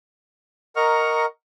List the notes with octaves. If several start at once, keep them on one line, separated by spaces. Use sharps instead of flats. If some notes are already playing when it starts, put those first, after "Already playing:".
A#4 D#5 F#5 A#5 C#6 F6